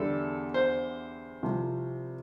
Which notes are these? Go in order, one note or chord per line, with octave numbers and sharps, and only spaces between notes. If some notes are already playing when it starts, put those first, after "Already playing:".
Already playing: E2 D3 G3 A4
C5
C2 C3 F3